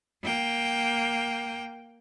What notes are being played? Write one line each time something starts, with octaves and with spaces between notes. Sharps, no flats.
A#3 G5